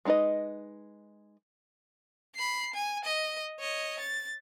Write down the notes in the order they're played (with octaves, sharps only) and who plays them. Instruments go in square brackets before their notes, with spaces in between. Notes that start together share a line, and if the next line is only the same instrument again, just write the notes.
[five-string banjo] G#3 D4 D#4 B4 D#5
[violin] B5 C7
G#5
D#5
C#5 D#5
A6